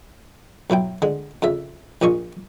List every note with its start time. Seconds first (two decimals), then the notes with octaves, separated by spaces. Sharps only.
0.70 B1 F#3 E4 G5
1.02 D3 G#3
1.42 F2 C#3 E5
2.02 A#1 A#2 F3 D#5 C#6